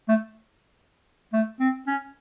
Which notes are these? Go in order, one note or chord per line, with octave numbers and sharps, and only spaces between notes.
A3
A3
C4
C#4